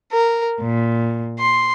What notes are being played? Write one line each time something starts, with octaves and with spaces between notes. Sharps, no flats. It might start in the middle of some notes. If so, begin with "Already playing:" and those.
A#4
A#2
C6